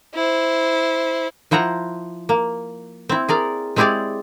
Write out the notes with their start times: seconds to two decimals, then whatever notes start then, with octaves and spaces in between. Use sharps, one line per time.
0.14 E4 C5
1.51 F3 E4 C5 F#5 A#5
2.29 A#3
3.09 C4 E4
3.29 G#4 A#4 D5
3.76 G#3 C4 E4 G4 G#4 D5